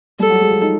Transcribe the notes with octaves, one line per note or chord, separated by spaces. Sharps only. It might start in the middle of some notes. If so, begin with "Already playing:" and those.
G3 G4 A4
F#3 F#4
G#3 G#4
F3 F4
D#4